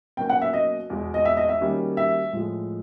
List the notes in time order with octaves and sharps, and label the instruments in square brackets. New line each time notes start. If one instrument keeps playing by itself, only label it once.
[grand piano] B2 F#3 A#3 C#4 F#4 [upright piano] G5
[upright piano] F#5
E5
D#5
[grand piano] E2 B2 G#3
[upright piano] D#5
E5
D#5
E5
[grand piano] D#3 G3 A#3 C#4 F#4
[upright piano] E5
[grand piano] A2 F3 G#3